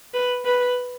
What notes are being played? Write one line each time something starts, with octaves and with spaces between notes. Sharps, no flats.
B4
B4